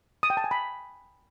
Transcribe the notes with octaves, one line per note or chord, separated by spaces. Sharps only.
D#6
G5
A5
G#5
B5